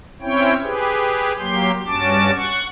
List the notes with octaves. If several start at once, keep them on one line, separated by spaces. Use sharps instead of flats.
C4 C#4 E4 C#5 G5
G4 G#4 B4
F#3 A#3 G4 C6 G6
G2 C#4 F#4 A5 D6
F#5 C#6